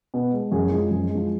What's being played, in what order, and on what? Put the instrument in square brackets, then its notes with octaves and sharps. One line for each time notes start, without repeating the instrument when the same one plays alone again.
[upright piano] B2
G#3
F#2 G#4
F3 G#3
F#2
G#3
F3